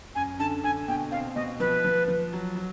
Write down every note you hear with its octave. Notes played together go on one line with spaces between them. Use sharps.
F#2 G#5
D3 A5
D3 G#5
B2 G5
C4 F5
B2 D#5
F3 B4
F3
F3
F#3
F#3